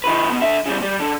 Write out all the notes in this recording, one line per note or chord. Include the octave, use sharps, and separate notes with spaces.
D#3 B4
B2
D3 E5
C#3 G3
G3
D3